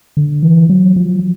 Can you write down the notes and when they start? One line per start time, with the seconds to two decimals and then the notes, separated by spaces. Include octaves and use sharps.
0.17 D3
0.43 E3
0.69 F#3
0.96 F3